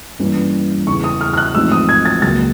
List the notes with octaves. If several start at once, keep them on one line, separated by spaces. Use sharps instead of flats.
G2 E3 G3 A#3 C#4
E2 C#3 E3 C#6
D#6
F6
F6
F#6
A1 G#2 F3 G#3 C4 E6
D#6
G#6
A6
C#2 C#3 F#3 A#3 A6